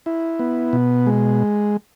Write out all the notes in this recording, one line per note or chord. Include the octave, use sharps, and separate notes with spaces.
E4
B3
B2
G#3